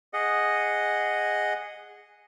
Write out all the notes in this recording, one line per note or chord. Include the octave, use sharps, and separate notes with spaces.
G#4 D#5 F#5